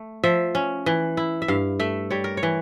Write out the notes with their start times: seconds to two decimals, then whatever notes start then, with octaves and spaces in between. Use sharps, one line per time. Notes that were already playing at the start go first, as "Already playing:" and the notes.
Already playing: A3
0.24 F3 E5
0.55 C#4
0.86 E3
1.17 E4
1.42 E5
1.48 G2 F5
1.80 A3 E5
2.11 G3 C#5
2.24 A#4
2.37 C#5
2.43 E3